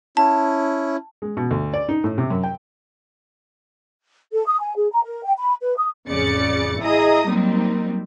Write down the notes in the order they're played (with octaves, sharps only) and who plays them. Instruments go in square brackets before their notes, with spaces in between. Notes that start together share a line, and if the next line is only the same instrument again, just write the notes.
[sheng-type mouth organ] C#4 E4 [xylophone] A5
[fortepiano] G#3
B2
D2
D5
D#4
A2
C3
F#2
G5
[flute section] A4
D#6
G#5
G#4
A#5
A#4
G5
B5
B4
D#6
[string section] A1 F2 C#3 D5 A6 C#7
E4 G#4 D#5 A#5 D#6
F#3 G3 A#3 C4 D#4